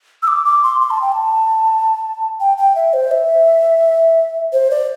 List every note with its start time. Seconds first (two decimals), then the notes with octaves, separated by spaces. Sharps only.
0.23 E6
0.28 D6
0.45 D6
0.63 C6
0.81 C6
0.91 A5
1.02 G5
1.12 A5
2.40 G5
2.57 G5
2.76 E5
2.93 C5
3.11 E5
4.53 C5
4.71 D5